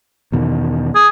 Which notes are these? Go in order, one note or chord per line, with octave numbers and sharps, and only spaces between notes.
E2 B2 D#3
G#4